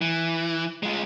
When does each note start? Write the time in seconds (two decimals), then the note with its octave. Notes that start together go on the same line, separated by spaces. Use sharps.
0.01 E3
0.83 G#3 F4